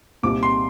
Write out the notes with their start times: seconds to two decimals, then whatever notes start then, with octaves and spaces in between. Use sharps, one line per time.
0.23 C2 A#2 G3 C4 D#4 D6
0.43 C6